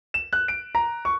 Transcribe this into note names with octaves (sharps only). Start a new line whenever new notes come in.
E7
F#6
D7
A#5
C#6